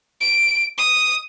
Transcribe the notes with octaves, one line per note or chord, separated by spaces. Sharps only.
D7
D#6